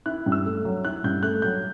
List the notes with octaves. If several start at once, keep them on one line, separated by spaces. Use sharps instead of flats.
E4 F#6
G2
E6
A3
F#3
E4 F#6
G2 G6
A3 F#6
F#3 G6